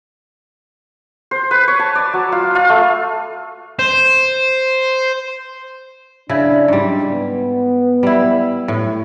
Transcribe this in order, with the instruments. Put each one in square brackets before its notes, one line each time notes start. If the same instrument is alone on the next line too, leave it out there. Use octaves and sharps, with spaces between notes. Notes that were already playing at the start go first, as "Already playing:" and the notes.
[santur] C5
B4
C#5
A5
D5
F#3
F4
F4
A3
[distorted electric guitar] C5
[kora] C#3 E4 [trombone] D4
[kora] G#2 G3
[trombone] B3
[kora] G3 E4
A2